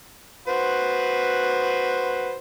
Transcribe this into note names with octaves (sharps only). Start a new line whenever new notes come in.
F#4 B4 C5